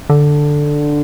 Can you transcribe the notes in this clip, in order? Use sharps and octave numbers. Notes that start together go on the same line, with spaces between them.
D3